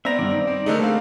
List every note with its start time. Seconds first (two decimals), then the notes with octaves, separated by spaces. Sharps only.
0.05 B3 C4 D5 E5 A#5 A#6
0.19 G2 D#3 D5
0.31 D#4
0.47 C4
0.66 D3 A3 D#4 G#4 A#4
0.80 A3 A#3 C4 F5